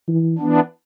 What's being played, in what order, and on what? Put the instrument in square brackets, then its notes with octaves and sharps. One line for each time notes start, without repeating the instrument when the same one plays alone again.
[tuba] E3
[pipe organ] E3 B3 D4